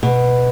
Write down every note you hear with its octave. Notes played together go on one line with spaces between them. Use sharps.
B2